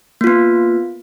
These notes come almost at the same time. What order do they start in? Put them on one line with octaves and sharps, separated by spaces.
A#3 F4 B3